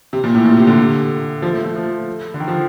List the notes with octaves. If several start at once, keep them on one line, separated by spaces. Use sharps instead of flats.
C3
A#2
A2
A#2
C3
D3
F3
A3
A3
F3
D3
D#3
F3